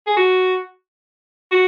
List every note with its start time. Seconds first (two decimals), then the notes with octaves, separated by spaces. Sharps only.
0.07 G#4
0.17 F#4
1.52 F#4